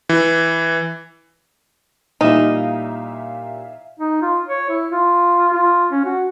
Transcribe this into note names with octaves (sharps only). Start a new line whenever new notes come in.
E3
A#2 E3 G3 D#4 E5 F5
D#4
F4
C#5
E4
F4
F4
C#4
F#4